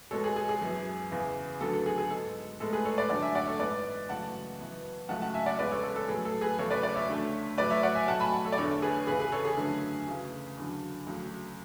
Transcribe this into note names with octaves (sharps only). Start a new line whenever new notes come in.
B2 G#3 B3 A4 C#5
G#4
G#4
G#4
F#2 E3 B3
E2 C#3 E3
D2 D3 F#3 B3 A4
A4
G#4
G#4
G#2 G#3 B3 A4
A2 G#3 B3 A4
G#4 B4
A4 C#5
B4 D5
F#2 D3 A3 D5 F#5
E5 G#5
D5 F#5
A4 C#5
G#2 E3 B3 B4 D5
F#2 C#3 E3 A3 F#5 A5
F#2 E3 B3
C#2 C#3 F#3 A3 F#5 A5
F#5 A5
E5 G#5
D5 F#5
E2 C#3 G#3 B3 B4 D5
A4 C#5
A4
A4
A2 F#3 B3 G#4
A4
G#4 B4
E2 C#3 F#3 A3 A4 C#5
B4 D5
B4 D5
C#5 E5
D2 D3 A3
A2 F#3 A3 B4 D5
C#5 E5
D5 F#5
E5 G#5
B2 F#3 A3 F#5 A5
G#5 B5
F#5 A5
A4 C#5
D5
E2 D3 A3 A4 C#5
G#4 B4
E2 C#3 E3 G#4 B4
G#4 B4
A4 C#5
G#4 B4
F#2 D3 A3
D2 C#3 E3
E2 D3 F#3
D2 C#3 F#3